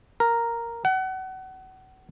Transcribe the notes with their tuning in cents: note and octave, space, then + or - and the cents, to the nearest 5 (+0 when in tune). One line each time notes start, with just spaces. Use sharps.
A#4 -5
F#5 +30